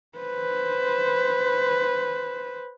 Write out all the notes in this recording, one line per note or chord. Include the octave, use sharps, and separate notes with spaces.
B4 C5